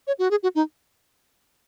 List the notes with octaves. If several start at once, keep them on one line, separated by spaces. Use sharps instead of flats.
C#5
F#4
G#4
F#4
D#4